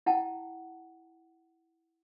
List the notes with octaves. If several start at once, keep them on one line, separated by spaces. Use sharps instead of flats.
E4 F#5 G5 A5